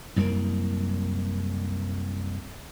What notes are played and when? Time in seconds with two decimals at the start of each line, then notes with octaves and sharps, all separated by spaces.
0.16 C2 F#2 A#3